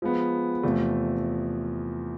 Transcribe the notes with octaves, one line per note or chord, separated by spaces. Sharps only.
F3 G#3 B3
E2 C3 F3 A3